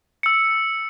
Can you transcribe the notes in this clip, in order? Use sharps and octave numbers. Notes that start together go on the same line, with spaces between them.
E6 C#7